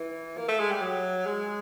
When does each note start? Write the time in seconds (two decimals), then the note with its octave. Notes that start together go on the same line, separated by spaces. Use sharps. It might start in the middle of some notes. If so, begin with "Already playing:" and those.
Already playing: E3
0.37 A#3
0.48 A3
0.60 G#3
0.71 G3
0.81 F#3
1.26 G#3